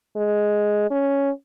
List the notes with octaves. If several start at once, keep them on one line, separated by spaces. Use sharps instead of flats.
G#3
C#4